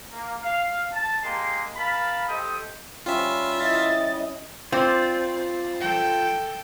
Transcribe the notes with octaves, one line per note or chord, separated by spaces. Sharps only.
A#3
F5
A5
G#3 A#3 G4 C6
A#4 F5 A5 B5
G4 A4 C5 D#5 G5 D#6
G3 C#4 F4 E5
E4 D#5 A6
C4 F4 D5
A4 G5